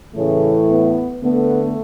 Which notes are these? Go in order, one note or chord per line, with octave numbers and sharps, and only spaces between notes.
A2 C#3 E3 A3 C#4
B3
D3 A3 B3